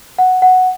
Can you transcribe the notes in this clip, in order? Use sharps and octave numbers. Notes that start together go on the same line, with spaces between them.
F#5
F#5